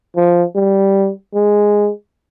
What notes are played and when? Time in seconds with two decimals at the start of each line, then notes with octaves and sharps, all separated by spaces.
0.16 F3
0.56 G3
1.35 G#3